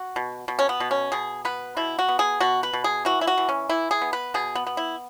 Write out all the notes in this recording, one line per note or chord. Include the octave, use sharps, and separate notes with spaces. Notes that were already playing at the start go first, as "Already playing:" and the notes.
Already playing: F#4
B2
B2
C#4
B3
B2
C#4
B2 G#4
B3 B4
B2 E4
F#4
B3
G#4
B2 F#4
B4
B2
G#4
E3 F#4
E4
F#4
E3
C#4
E3 E4
G#4
B3
B4
B2 G#4
B3
B3
E4